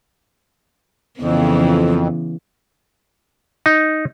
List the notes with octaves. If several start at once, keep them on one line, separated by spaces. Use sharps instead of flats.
F2 C#3 E3 B3
D#4